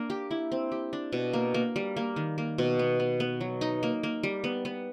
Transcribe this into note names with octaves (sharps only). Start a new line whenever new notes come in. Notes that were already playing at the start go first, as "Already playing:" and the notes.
Already playing: A#3 D4
G4
E4
C4
G4
D4
B2
A#3
A#3
G3
A#3
D#3
A#3
B2
B3
B3
B3
F#3
D#4
A#3
A#3
G3
B3
B3